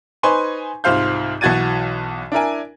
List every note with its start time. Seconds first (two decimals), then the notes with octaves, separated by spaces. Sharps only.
0.23 D#4 B4 C5 G#5 C6 C#6
0.84 C2 G#2 F4 C5 F5 G6
1.41 B1 E3 F#4 G#6 A6 D#7
2.32 D4 E4 A#4 G#5